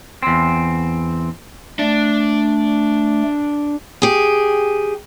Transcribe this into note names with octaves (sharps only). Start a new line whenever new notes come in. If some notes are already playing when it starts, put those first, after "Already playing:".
E2 C4
A3 D4
G4 G#4